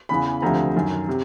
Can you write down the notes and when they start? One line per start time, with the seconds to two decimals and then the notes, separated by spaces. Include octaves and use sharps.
0.09 E2 C#3 E3 B5
0.42 D2 C3 F3 A#5
0.75 F#2 D#3
1.08 C3